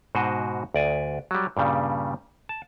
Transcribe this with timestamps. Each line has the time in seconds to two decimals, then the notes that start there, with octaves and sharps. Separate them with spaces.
0.15 G#2 B2 F#4 C5 D#5
0.74 D2 D5 G#5
1.31 F#3 G3
1.57 G2 A#2 C#3 G3
2.49 A5